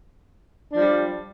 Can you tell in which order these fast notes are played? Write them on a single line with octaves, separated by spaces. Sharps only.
D4 F3 G3